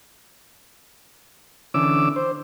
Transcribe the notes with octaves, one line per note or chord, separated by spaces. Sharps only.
D3 E3 C#4 D6 E6
C5